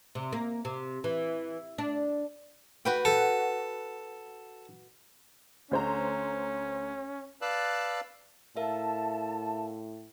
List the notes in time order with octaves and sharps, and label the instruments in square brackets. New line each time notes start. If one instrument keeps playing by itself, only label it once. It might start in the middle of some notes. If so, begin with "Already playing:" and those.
[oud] C3
A#3
C3
E3
D4
[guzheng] F#4 B4 G5
[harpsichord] A4
[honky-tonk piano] D2 C5 A#5 [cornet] C#4
[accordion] B4 D5 F5 A5 E6 F#6
[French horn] A2 [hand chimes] A#4 E5 F5 [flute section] A5